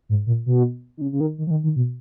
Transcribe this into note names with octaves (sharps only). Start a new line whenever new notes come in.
G#2
A#2
B2
D#3
C#3
C#3
D#3
D#3
F3
D#3
D#3
B2